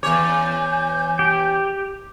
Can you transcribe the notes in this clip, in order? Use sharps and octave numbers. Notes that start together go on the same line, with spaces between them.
E2 C#5 G#5 D6 G6
G4